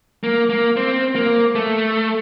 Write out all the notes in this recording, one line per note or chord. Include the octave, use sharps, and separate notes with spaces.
A#3
A#3
C4
A#3
A3